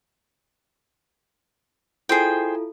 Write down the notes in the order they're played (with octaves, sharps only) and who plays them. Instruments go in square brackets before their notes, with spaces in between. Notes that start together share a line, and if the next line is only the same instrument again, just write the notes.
[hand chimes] E4 F4 A4 [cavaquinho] G#4 C5 G5